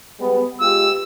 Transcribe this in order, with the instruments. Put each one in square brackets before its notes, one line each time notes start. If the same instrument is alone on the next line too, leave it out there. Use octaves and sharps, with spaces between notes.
[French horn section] G3 G#3 B3
[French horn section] G#3 F4 G4 [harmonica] E6